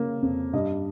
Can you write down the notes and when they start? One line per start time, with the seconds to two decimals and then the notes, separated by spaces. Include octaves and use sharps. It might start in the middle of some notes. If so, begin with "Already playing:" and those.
Already playing: C#3 A#3
0.22 F2
0.53 G2 D#5